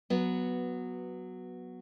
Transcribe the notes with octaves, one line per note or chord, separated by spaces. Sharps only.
F#3 B3